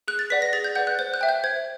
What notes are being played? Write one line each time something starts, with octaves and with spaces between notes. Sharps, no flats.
G#4 F#6
A6
B4 D5 F#5 B6
A#6
G#4 A6
G6
B4 D5 F#5 G6
F#6
C5 G6
F#6
E5 G5
G6
C5 G#6